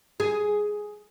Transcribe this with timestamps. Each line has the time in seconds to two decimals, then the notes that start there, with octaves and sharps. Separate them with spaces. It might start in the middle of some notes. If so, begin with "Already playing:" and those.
0.20 G#4